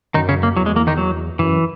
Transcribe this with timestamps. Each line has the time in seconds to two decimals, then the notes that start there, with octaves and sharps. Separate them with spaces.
0.14 F#2 D#3 D#4
0.29 C#3 C#4
0.43 A#3
0.56 E2 F#3
0.66 G#3
0.76 A#3
0.87 D#3 D#4
0.98 F#3
1.39 F#2 E3